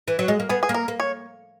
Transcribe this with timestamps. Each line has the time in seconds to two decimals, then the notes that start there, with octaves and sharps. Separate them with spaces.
0.08 E3
0.19 F#3
0.28 G#3
0.40 A#3
0.49 B3 G#4
0.63 G#4
0.69 A#3
0.74 A#4
0.88 A#3
1.00 C#5